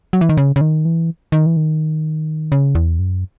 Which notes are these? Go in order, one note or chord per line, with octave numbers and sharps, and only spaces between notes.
F#3
E3
D#3
C#3
C#3
D#3
E3
D#3
E3
D#3
C#3
E2
F#2